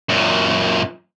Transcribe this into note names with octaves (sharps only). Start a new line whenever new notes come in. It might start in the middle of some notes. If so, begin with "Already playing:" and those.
F#2 A#2